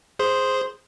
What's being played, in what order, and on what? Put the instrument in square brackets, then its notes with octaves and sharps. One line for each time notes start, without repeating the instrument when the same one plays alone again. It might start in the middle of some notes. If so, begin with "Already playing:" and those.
[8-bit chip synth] G#4 C5 C6